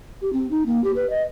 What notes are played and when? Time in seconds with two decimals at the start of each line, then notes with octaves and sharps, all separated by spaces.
0.22 G4
0.33 C4
0.51 D#4
0.66 A#3
0.84 G4
0.96 B4
1.10 D#5